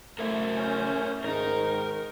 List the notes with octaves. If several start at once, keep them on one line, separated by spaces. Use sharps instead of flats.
F#2 A3 A#4 C5 E5
C#4 G6
G#2 D#3 D#4 A#4